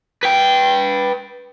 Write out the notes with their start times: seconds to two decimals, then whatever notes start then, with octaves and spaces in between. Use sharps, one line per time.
0.23 B4 G5